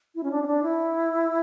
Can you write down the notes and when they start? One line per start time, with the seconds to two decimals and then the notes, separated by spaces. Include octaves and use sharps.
0.15 E4
0.23 C#4
0.31 D4
0.42 C#4
0.47 D4
0.63 E4